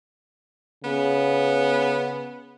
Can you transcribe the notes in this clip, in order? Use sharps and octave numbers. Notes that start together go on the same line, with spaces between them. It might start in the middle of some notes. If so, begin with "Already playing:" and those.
C#3 B3